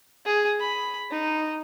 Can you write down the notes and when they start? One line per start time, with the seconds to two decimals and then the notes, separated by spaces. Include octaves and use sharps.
0.26 G#4
0.60 B5
1.11 D#4